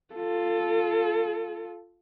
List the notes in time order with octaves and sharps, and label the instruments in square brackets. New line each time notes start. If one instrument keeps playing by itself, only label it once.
[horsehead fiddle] F4 A4